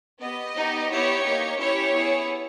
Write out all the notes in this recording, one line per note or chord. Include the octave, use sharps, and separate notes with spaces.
B3 G4 D#5
B3 D#4 G4
B3 E4 G4 C#5
A#3 D#4 G4
C#4 E4 G4 C#5
B3 E4 G#4